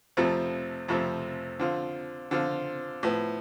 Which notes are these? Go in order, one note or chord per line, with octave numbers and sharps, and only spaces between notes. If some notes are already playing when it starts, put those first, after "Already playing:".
F2 C3 F3 A3 C4
F2 C3 F3 A3 C4
D3 F3 C4 F4
D3 F3 C4 F4
A2 F3 B3